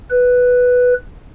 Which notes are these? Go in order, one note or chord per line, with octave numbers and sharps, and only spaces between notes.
B4